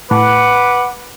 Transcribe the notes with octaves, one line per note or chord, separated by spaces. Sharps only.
A2 B4 F#5 D6